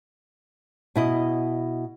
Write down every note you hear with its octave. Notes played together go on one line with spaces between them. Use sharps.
B2 E4 D#5